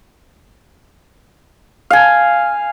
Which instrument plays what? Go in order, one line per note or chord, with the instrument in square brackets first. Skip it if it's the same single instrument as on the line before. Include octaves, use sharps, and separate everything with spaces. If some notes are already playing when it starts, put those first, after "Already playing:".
[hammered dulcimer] F5 G#5